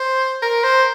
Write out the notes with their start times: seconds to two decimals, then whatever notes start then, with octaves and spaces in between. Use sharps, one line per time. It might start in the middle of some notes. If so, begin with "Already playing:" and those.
Already playing: C5
0.42 A#4
0.64 C5